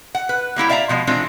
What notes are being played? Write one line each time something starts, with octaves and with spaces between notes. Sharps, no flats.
F#5
B4
G3 A#3 E4 G4
D5 E5 F5 G#5 A#5
B2 F3 G#3
E3 G#3 C4 D4 F4